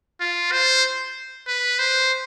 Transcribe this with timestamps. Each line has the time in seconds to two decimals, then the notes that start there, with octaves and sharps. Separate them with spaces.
0.20 F4
0.52 C5
1.47 B4
1.79 C5